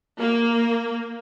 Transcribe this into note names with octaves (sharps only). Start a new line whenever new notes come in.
A#3